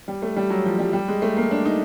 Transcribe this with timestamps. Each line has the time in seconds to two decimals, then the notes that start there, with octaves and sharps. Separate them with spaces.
0.08 G3
0.22 A3
0.36 G3
0.50 F#3
0.65 F3
0.79 G3
0.93 G3
1.08 G#3
1.22 A3
1.37 A#3
1.51 D4
1.65 D#4